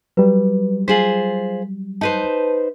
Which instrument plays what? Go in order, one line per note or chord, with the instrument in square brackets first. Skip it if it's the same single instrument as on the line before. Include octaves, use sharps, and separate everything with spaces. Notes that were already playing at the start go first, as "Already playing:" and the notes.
[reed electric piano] F#3 G3 [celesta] B4
[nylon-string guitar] F4 G#4 C5 [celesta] B6 F#7
[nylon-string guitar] D#4 B4 C5 [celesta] A5 D#7